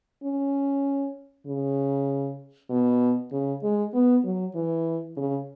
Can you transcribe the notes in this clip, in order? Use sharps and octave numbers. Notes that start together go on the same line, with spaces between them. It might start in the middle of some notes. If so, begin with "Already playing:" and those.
C#4
C#3
B2
C#3
G#3
B3
F#3
E3
C#3